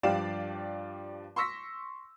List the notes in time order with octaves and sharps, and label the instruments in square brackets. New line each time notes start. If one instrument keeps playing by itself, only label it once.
[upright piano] G2 F3 G4 D5 F5 E7
C6 C#6 E6 A#6 B6